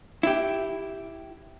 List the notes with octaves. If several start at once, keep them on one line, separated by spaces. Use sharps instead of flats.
E4 G4